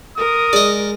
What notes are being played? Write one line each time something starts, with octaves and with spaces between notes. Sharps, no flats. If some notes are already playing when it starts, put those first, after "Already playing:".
A#4 D#6
G#3 D5 D#5